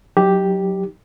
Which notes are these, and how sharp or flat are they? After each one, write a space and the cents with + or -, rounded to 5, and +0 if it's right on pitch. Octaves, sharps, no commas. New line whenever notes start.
F#3 +0 D#4 +10 G4 +0